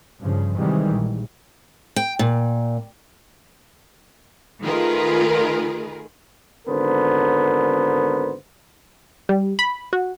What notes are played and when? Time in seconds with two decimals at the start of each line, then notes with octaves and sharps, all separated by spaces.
0.19 G2 C#3 F3
0.57 C3 D#3 E3 G3 G#3
0.90 A#1
1.96 G5
2.19 A#2
4.64 D#3 A3 F4 G#4 A#4 B4
6.68 G#1 D3 B3 A#4 C5
9.29 G3
9.59 B5
9.93 F#4